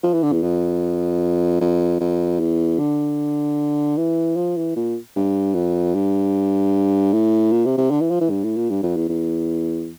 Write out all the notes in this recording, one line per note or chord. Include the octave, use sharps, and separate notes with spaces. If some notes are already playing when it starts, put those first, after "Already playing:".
F3
E3
D3
E2
F2
F2
F2
E2
D3
E3
F3
E3
A#2
G2
F2
G2
A2
A#2
C3
C3
D3
E3
F3
E3
G2
A2
A#2
G2
F2
E2
E2